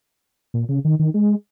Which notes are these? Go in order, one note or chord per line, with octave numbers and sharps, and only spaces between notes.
A#2
C#3
D#3
D#3
G#3